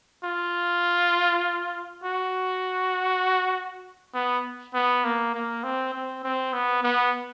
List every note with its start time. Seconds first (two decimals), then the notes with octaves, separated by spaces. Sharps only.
0.24 F4
2.04 F#4
4.14 B3
4.74 B3
5.04 A#3
5.34 A#3
5.64 C4
5.94 C4
6.24 C4
6.53 B3
6.83 B3